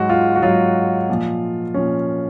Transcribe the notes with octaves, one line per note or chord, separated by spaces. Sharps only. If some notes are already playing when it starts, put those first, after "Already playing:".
Already playing: G#2 F#3 F#4
F4
F#4
G#2 F#3 F4
A#2 F3
A#2 F3 C#4